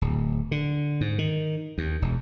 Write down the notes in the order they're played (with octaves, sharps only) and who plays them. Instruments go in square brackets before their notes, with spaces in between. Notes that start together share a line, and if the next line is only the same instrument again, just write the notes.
[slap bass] D1
D3
G#2
D#3
D#2
E1